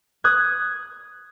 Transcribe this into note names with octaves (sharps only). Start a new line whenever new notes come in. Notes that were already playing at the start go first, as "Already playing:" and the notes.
D#6 F#6 G#6